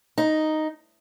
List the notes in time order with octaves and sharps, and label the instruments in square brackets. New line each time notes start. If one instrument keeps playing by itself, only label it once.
[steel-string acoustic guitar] D#4